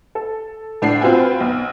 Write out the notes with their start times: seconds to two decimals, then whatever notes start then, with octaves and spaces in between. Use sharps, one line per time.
0.15 A4
0.82 A2 D4 F#5 C7
1.01 C4 F4 F#4 B4 G5 G#5
1.40 B1